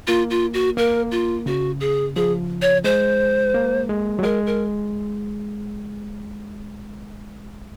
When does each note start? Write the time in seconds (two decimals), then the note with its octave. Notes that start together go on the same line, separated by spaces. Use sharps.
0.07 A#3 F4
0.30 F4
0.54 F#4
0.77 A#3 A#4
1.11 F4
1.46 C#3 F#4
1.81 G#4
2.16 F3 G#4
2.62 C#5
2.84 G#3 C5
3.54 A#3
3.89 G#3
4.19 F#3
4.23 G#3 A#4
4.47 A#4